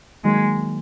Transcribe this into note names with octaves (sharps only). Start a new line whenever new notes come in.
D#3 F#3 G#3 A#3